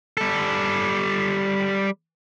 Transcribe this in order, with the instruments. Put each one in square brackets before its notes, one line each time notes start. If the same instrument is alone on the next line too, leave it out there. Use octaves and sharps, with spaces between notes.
[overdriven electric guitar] G3 A4